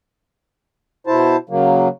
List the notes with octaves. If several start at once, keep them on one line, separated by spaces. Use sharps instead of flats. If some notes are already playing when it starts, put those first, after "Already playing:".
B2 E4 C5 A5
C#3 F#3 A#3